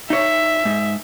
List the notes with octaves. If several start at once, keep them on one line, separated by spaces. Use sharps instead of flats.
D#4 C#5 E5
G#2